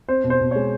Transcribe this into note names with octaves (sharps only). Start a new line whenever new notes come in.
C4 C5
B2
C5
B2
G#3 C#5